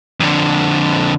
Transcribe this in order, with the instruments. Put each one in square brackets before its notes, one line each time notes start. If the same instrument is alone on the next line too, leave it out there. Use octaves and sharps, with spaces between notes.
[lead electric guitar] F2 D3